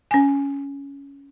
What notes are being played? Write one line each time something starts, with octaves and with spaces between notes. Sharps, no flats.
C#4 G#5